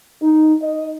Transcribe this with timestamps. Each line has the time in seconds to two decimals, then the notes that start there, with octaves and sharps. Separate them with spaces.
0.21 D#4
0.62 D#5